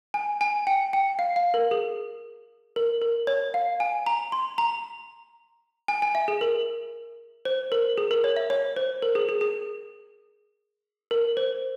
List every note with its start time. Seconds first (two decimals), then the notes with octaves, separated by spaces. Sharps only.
0.14 G#5
0.41 G#5
0.67 G5
0.93 G5
1.19 F5
1.36 F5
1.54 A#4
1.71 G#4
2.76 A#4
3.02 A#4
3.27 C#5
3.54 F5
3.80 G#5
4.06 A#5
4.32 C6
4.58 A#5
5.88 G#5
6.02 G#5
6.15 E5
6.28 G#4
6.41 A#4
7.45 C5
7.72 A#4
7.98 G#4
8.11 A#4
8.24 C#5
8.36 E5
8.50 C#5
8.76 C5
9.02 A#4
9.15 G#4
9.29 G#4
9.41 G#4
11.11 A#4
11.37 C5